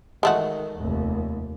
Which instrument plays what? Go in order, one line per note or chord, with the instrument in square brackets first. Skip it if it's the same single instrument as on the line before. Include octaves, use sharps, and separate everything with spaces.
[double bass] D#3 [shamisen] G#3 A3 F#4
[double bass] F1 D#2